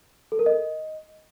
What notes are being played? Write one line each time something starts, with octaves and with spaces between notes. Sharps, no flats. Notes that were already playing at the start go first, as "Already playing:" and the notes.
A4
A#4
D#5